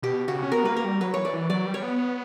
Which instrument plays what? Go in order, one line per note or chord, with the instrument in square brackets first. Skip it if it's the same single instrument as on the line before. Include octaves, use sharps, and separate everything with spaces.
[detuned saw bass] B2 [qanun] G4
[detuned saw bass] C#3 [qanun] F#4
[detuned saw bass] C#4
[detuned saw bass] B3 [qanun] A#4
[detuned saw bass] G3 A#3 [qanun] B4
[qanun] A#4
[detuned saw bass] G3
[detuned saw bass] F#3 [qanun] B4
[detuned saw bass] E3 [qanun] C#5
[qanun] D5
[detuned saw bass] E3
[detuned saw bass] F#3 [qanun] D5
[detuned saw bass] G3
[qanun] C#5
[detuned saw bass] B3